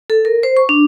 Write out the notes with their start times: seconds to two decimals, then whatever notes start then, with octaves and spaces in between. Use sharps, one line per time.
0.10 A4
0.25 A#4
0.43 C5
0.57 C#6
0.69 D4